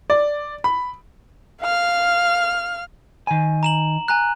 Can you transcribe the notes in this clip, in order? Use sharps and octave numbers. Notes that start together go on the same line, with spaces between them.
D5
B5
F5 F6
D#3 G#5
A#5 E7 F#7
G#5 A#5 F#6